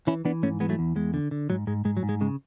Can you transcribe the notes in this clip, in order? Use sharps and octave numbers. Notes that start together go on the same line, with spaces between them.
E3 C#4 E4
E3 B3 D4
G#2 A3 C#4
E3 G#3 B3
F#3 A3
E2
E2 G#3
D3
D3
G#2 F#3
G#2 G#3
G#2 G#3
F#3
G#2
G#3
C#3 G#3